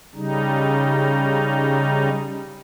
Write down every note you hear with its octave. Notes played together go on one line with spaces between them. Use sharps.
C#3 G3 D#4